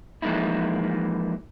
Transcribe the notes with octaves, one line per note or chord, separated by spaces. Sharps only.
E3 F3 G#3 A#3 D#4 E4